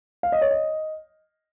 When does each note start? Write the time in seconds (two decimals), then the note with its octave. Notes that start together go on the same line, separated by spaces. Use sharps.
0.23 F5
0.32 D#5
0.41 C#5
0.51 D#5